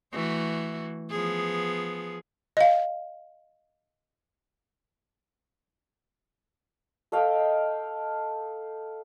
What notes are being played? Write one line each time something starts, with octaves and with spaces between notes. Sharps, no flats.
E3 A3 F#4
F3 B3 G#4
D#5 F5
A4 D#5 F5 G5